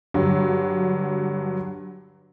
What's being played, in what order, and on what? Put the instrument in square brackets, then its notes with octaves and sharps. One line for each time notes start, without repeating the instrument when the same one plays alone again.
[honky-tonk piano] G2 D3 F#3